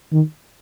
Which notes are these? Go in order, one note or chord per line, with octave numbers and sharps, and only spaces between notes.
D#3